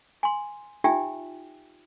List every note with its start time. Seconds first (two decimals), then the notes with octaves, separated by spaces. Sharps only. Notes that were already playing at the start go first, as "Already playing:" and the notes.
0.23 G#5 C6
0.84 D#4 F4 G4 E5 G5 G#5